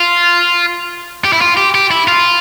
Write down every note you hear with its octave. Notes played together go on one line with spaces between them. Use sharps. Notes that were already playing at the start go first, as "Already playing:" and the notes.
Already playing: F4
G4
E4
F4
G4
G4
E4
F4